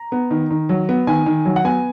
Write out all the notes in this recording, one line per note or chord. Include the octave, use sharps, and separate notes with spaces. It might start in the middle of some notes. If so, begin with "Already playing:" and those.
Already playing: A#5
B3
D#3
D#3
F#3
B3
D#3 G#5
D#3
F#3
F#5
B3 G#5